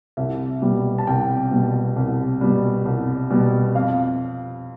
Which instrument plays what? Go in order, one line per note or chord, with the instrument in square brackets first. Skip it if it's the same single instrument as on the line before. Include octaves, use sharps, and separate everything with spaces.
[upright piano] C2 E5
B2 G3
A5
C2 G5
B2 G3
C2
B2 G3
C2
B2 G3
F2 F5